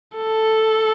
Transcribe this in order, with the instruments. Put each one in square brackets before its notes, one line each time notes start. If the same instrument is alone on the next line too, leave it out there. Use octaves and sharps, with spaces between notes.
[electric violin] A4